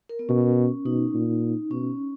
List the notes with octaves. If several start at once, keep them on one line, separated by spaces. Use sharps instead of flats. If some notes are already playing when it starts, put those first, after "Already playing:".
A#4
B3
B2 C#4
B2 D#4
A#2
B2 C#4